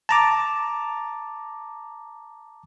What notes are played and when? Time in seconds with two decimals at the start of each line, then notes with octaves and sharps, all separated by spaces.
0.09 A5 A#5 D6